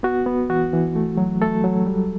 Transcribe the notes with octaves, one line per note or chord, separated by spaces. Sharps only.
B3 F#4
B3
E3 F#4
E3
A3
F#3
A3 A4
F#3
G3